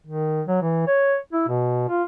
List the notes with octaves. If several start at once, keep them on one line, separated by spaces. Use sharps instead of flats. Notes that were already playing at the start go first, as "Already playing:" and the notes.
D#3
F#3
E3
C#5
E4
B2
F4